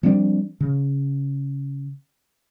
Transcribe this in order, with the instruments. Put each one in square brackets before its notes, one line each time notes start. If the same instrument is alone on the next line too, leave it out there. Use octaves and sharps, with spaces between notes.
[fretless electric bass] F3 G3 C4 D4
C#3